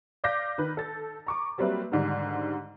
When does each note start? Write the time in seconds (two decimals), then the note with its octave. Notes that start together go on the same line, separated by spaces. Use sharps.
0.24 D5 F5 D6 G6 A#6 B6
0.58 D#3 B4
0.77 A4 A6
1.27 A#5 C#6 D6
1.58 F#3 G3 A#3 C4 B4 E5
1.92 G#2 D3 D#3 G3 D#4